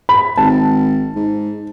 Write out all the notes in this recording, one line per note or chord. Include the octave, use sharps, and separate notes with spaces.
B5
G#1 A5
G#2